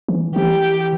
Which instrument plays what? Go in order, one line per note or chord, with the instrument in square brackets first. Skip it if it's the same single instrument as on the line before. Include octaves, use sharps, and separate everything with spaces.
[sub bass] E3
[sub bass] E3 [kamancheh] G4